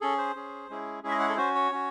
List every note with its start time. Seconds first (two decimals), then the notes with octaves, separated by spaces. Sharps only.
0.01 C#4 G#4 A4
0.18 C5
0.36 C#4 G#4
0.70 G#3 C#4 E4 G#4
1.03 G#3 C#4 E4 G#4 E5
1.11 D#5
1.20 F#5
1.29 A4
1.37 C#4 F#4 C5
1.55 C#5
1.72 C#4 F#4